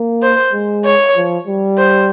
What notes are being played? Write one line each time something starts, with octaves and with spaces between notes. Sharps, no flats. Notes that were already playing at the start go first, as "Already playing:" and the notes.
Already playing: A#3
C5
G#3
C#5
F3
G3
C5